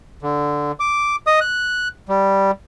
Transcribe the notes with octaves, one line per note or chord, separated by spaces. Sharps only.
D3
D6
D#5 D#6
F#6
G3